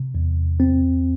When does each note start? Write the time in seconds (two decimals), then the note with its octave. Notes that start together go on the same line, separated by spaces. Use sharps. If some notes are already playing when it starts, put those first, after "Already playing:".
Already playing: C3
0.15 E2
0.60 C4